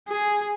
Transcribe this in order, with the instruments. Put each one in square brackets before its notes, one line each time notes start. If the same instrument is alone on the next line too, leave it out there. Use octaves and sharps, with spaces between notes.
[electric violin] G#4